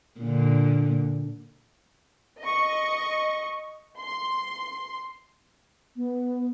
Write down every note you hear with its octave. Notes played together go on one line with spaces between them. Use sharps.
A#2 D3
D#5 C#6
C6
B3